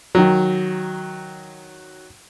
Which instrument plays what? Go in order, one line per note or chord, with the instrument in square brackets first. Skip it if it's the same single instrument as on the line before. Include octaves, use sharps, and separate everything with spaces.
[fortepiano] D#3 F#3